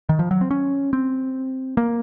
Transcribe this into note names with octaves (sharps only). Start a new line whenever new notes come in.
D#3
F3
F#3
C4
C#4
C4
A#3